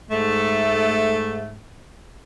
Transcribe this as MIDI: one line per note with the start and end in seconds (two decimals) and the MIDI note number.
0.10 1.59 44
0.10 1.59 57